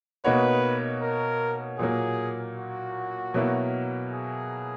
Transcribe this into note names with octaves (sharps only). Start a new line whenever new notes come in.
B2 A#3 D#4 F#4 B4 C#5
A#4
A#2 F#3 A#3 G#4
F#4
B2 F#3 A#3 E4 A#4
G#4